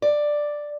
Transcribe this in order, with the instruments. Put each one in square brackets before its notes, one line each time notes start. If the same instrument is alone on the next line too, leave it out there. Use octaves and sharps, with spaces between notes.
[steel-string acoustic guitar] D5